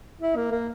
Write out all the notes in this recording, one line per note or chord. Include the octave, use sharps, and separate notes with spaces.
E4
A#3
A#3